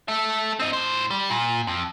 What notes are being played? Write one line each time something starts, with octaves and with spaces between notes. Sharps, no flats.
A4 E5
C4 D#5
A2 C5
G3
A#2
F2